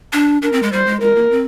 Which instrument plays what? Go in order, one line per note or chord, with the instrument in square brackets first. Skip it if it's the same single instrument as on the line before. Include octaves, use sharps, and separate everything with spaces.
[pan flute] D4
[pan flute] D4 [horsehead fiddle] A#4
[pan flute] C4
G#3
[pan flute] G3 [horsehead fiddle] C5
[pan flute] G#3
[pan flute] G#3 [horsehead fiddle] A#4
[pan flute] A#3
C4